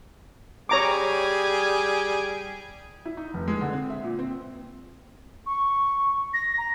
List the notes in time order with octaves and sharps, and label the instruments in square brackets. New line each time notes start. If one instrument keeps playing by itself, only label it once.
[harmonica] G3 G#4 [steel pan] C#5 A#5 D6
[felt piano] E4
D#4
F1
G#3
D3
C4
E5
A#2
C4
[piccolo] C#6
A#6
A#5